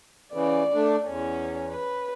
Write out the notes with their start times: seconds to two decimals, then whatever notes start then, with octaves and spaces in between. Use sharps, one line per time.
0.33 C#3 E3 D5
0.74 A3 D4
1.07 E2 C#4
1.71 B4